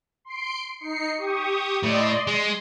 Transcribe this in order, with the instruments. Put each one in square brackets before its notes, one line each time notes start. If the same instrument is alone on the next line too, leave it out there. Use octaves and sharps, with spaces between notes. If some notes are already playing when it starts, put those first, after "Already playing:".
[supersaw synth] C6 C7 D7
D#4 C7 C#7
G4 C#6 D#6
[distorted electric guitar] A2 [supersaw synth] D5 D#5 C6
[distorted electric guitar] G#3 [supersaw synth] C6